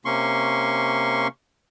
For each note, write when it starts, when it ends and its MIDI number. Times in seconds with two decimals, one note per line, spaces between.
0.05 1.28 48
0.05 1.28 58
0.05 1.28 61
0.05 1.28 84
0.05 1.28 85